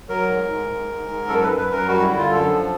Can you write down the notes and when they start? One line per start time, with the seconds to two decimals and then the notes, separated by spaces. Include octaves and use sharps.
0.08 F#3 A#4
0.28 G#2
0.48 G#2
0.68 G#2
0.88 G#2
1.08 G#2
1.27 F#2 A4
1.43 F#2 B4
1.58 B4
1.67 F#2 A#4
1.88 G3 F#4
2.03 D3 E4
2.18 F4
2.27 F#2 A4
2.47 F3